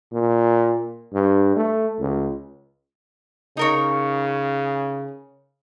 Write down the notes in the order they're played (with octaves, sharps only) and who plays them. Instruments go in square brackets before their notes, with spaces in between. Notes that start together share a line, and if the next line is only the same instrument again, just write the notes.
[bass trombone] A#2
G2
A3
C#2
[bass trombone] C#3 [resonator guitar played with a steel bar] D#4 A#4 C#5